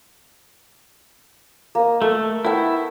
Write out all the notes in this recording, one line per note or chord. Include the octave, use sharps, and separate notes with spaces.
A#3 D#5
A3 A4
A3 B3 E4 G5